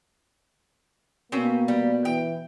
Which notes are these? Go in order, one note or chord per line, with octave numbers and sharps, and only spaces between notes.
B2 A#3 C4 C#4
G3
E3 G5